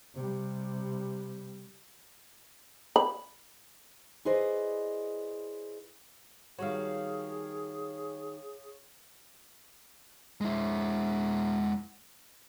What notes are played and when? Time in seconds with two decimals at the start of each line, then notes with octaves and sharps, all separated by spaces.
0.15 C3 G3
2.96 B5
4.25 E4 G#4 B4 C5 D5 D#5
6.58 D#3 G3 F#4 G#4 C#5 F5
10.41 G#3 E4